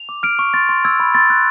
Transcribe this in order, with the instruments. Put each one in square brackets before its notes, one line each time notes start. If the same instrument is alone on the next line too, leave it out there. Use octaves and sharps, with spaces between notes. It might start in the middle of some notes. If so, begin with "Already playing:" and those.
Already playing: [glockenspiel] F7
D6
F6 D7
C#6
C6 A6
C6
E6 G#6
B5
C6 A6
F#6